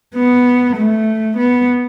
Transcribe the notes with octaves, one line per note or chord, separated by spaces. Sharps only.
B3
A3
B3